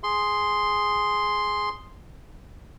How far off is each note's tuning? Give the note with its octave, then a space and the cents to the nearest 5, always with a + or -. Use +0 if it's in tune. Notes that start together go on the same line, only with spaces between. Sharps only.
G#4 +0 C6 +0